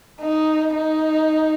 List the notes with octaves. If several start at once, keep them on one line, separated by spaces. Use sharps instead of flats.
D#4
D#4